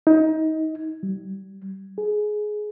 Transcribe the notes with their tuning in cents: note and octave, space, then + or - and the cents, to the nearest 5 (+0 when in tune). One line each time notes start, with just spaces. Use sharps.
D#4 +25
G3 -30
G#4 +15